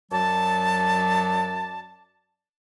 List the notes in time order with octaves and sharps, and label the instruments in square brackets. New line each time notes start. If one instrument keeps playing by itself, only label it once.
[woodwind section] F#2 F#3 D5 A5